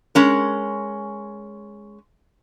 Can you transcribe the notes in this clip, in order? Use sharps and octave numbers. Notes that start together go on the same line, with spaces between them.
G#3 C#4 A#4